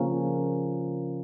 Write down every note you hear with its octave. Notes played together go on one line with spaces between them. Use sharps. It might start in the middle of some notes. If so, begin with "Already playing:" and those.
Already playing: C#3 F3 A#3 C#4